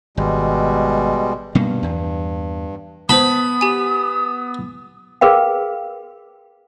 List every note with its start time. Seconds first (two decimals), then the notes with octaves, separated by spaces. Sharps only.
0.17 G#1 B2 G3 G#3
1.55 G2 B2 G3 A#3
1.83 E2
3.09 B3 C5 A5 B5 D#6
3.61 G4 G#5
5.21 G#4 A#4 B4 F5 G5